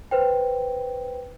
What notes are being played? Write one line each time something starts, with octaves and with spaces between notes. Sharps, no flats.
B4 C5 G5